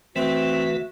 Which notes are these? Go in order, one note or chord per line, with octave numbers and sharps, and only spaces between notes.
E3 A3 C4 F#4 B4 E5